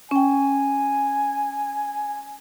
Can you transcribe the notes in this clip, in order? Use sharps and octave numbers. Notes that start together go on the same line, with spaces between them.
C#4 G5 G#5